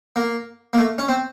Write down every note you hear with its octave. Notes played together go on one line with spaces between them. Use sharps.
A#3
A#3
A3
C#4
C4